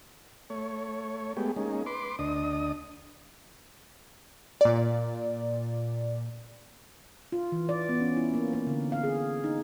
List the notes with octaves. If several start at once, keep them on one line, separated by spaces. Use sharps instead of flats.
A3 C#5
G#3 A3 B3 G4
G#3 A#3 C#4 D#4
B4 C6 D6
D2 D4 D#5 D#6
A#2 D5
F4
E3
D5
B3
C#4
E4
A#3
A#3
D3
F5
G#4
D#4